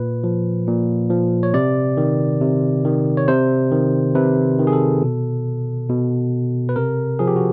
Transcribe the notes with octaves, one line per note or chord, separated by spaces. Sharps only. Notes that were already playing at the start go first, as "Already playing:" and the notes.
Already playing: A#2 B4
F3
A#2
F3
C#5
C3 D5
D#3
C3
D#3
C#5
C3 C5
D#3
C3 B4
D#3
G#4
A4
B2
B2
B4
C3 A#4
F3 G#4
G4
F#4